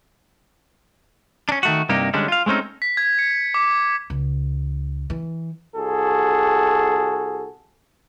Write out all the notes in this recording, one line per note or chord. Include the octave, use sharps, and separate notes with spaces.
C#4 D4
D#3 A3 F#4
C2 G2 C3 A#3 D#4 G4
D3 G3 G#3 C#4 D4
F4 F5
G#3 A3 C4 C#4 D#4
B6
G#6
C#7
D6
C#2
E3
C2 F#4 G#4 A4